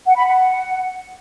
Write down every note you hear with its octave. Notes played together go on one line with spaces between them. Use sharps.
F#5
B5
F#5